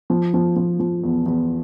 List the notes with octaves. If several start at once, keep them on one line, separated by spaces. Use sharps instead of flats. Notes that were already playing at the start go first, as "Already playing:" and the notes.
F3
F3
F3
F3
E2
E2